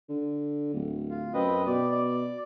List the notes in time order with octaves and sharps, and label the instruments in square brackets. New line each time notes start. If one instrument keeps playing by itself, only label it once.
[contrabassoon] D3
D1
[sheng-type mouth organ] F4
[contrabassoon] F#2 [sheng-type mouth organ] C4 B4 D#5
[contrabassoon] B2 [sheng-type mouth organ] D5
[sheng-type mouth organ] D5